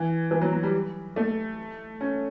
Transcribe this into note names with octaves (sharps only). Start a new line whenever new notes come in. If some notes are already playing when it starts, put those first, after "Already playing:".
Already playing: E3
E3
F#3
F#3
G3
A3
C#4